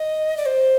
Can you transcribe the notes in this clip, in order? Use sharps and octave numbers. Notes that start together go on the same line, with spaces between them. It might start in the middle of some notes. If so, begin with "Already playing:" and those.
Already playing: D#5
D5
C5